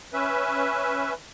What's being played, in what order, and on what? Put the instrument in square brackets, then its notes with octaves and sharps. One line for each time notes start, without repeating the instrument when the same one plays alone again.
[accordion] C#4 B4 E5